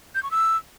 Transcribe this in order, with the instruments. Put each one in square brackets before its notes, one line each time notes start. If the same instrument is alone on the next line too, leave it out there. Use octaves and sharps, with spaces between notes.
[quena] G6
C#6
E6